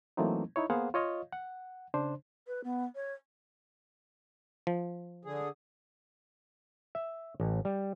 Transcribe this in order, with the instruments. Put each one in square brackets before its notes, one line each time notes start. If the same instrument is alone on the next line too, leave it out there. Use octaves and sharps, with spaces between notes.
[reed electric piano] E3 F#3 A3 A#3 C4 D#4
D#4 E4 C#5
A#3 B3 G#4 C5 F5 F#5
F4 C#5 D#5 F5
F#5
C#3 D4 C5
[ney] B4
B3
C#5
[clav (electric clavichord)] F3
[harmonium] D3 G#4
[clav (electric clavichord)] E5
A1
G3